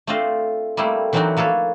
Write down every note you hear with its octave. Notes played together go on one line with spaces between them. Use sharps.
A3 C4 D4 F4 C5 D#5
G3 A3 A#3 C4 E4
E3 F#3 C4 D4 D#4 F#4
F3 A#3 A4 B4 C#5